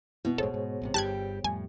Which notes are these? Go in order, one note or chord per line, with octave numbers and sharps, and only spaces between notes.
B2 B3 E4
E1 G#2 G#4 A4 C5 C#5
G#2
A1 G#2 C3
G1 G2 G3 G4 A5 F#6 G#6
F2 A2 G3 G#5